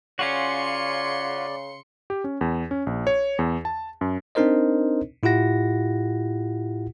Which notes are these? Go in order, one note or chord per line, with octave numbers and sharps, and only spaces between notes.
C#3 C#4 F4 F#4 D5 C6 C#7
G4
C#4
E2
C#4
A#1
C#5
E2
A5
F#2
C4 D4 D#4 A#4 C5 D#5
A2 E4 F4 G4 F#5 A#6